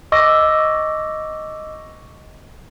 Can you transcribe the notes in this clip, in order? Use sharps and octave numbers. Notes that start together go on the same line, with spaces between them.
D#5 C#6 D6 E6 A#6